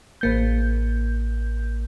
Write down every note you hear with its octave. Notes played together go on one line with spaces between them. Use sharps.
A1 A#3 G6